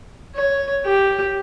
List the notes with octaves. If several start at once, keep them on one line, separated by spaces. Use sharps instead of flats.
C#5
G4